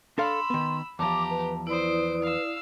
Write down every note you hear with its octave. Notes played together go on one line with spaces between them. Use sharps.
D4 A4 F5 B5 C6 E6
D#3 B3
E2 F3 G4 A5 A#5 D6
B4
E4 B4 C5 D5 D#6 D7
F5 E6